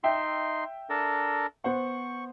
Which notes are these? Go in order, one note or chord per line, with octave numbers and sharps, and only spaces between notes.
D#4 E5 G5 C6
D4 A4 A#4
B3 C5 F#5 C#6